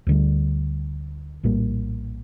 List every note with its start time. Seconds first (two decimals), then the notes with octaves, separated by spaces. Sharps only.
0.07 D2 D3 G3
1.43 A#1 A2 G3 A#3